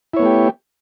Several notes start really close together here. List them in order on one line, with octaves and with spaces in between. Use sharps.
E4 C#5 B3 A3 G4